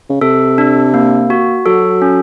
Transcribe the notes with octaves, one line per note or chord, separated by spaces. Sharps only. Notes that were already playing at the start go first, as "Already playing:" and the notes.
C#3
C3 A4
D4
A#3
F#4
F#3 A4
C#4